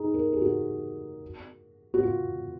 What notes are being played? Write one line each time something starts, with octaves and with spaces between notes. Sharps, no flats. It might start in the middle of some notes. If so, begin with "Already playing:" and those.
Already playing: D#4 G#4
A#4
G#4
F#4
F#4
F4